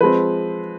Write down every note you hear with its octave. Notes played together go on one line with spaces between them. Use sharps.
F3 G#3 C4 B4